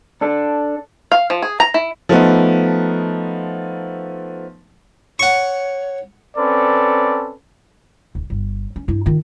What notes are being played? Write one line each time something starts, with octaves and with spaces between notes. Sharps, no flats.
D4 A4
F5
F3
G#4
A#5
E4
F3 A3 B3 D#4
C#5 F#5 C#6
C4 C#4 A4 B4 D5
D1
G1
C#4
G2 E4
D#3 F4